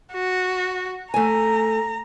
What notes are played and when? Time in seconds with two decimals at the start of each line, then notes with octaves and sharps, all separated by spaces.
0.13 F#4
1.14 A3 G#5 A#5